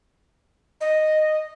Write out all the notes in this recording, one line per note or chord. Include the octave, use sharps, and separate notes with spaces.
D#5